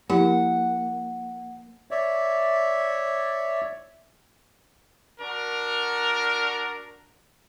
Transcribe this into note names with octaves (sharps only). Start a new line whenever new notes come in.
F3 A#3 E4 G4 F#5
C#5 D5 E5
D4 F#4 A#4